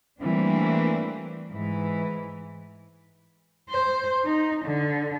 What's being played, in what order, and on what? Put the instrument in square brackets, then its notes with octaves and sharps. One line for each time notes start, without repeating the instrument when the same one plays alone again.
[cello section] E3 G3 A3 A#3 C4 D4
G#2 E3
[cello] C5
D#4
D3